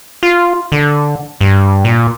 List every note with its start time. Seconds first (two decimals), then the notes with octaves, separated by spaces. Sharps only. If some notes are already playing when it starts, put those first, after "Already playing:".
0.23 F4
0.72 D3
1.41 G2
1.85 A#2